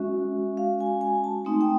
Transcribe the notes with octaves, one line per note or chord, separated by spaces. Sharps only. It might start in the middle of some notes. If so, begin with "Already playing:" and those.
Already playing: G#3 C#4 F#4 E5
F5
G#5
G#5
A5
A3 C4 D#4
G5